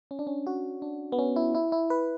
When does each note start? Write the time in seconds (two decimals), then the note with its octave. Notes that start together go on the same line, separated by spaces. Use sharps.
0.11 C#4
0.19 D4
0.27 C#4
0.47 F#4
0.82 D4
1.12 B3
1.19 C#4
1.36 E4
1.55 E4
1.72 E4
1.90 B4